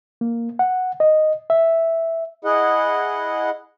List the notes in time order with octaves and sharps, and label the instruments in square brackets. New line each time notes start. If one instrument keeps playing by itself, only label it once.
[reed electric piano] A#3
F#5
D#5
E5
[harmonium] E4 G#4 D#5 F#5